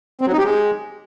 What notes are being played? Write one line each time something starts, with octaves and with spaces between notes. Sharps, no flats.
C4
F#3
D#4
G4
G#3